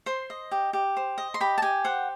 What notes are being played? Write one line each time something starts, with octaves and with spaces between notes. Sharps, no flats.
C5 C6
D#5
G4
G4
C5
D#5
C6
G4 B5
A5
G4 G#5
C5 F#5